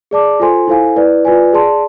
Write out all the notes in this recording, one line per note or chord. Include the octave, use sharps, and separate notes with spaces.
G#4 D5 A5 D6
F4 A4 C5 G#5 C6
E4 A4 C5 F5 G#5
E4 B4 D5
F4 B4 D5 G#5
G#4 D5 A5 C6